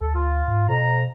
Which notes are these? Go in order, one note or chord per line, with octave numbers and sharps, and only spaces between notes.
D2 A4
F4
G#2
F2 B2 A#5